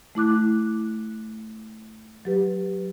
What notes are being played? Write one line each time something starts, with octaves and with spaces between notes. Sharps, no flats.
A3 E4 D6 F#6
F#3 G4 B4